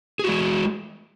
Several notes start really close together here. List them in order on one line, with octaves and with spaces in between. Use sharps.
G#4 F#4 G#3